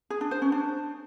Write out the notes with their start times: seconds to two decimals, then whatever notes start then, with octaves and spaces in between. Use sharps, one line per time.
0.10 G#4
0.21 D4
0.31 C5
0.42 C#4
0.52 D4